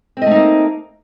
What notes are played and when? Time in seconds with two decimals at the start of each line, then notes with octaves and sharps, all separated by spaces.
0.17 C4
0.22 D#5
0.26 A3
0.31 D#4
0.36 A#3